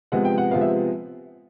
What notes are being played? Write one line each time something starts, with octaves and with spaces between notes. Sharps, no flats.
C3 F3 G#3 B3 F#5
G5
F#5
C3 F3 G#3 B3 F5
E5